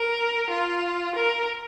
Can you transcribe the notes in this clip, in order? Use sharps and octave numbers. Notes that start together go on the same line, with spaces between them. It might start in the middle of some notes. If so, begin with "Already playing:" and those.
Already playing: A#4
F4
A#4